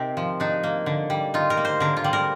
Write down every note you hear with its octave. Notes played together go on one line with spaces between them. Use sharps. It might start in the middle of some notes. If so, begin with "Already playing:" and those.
Already playing: C3 C4 D#4 G4 A#4
F3
D4 D#4
A#3
D3
G3
D#4 F4
A#4
A#3
C5
D3 A#4
F4
G3
A#4